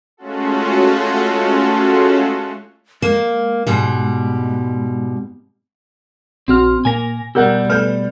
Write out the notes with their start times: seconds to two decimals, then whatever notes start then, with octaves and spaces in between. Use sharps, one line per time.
0.17 G#3 A3 C#4 F4 F#4 A4
3.02 G#3 A#3
3.67 G#2 B2 G3
6.48 A#1 C4 F#4 F6
6.85 A#2 A#3 G#5 A#6
7.35 B2 G3 G4 A#4 F#5 E6 G6
7.70 A3 B4 F6 G6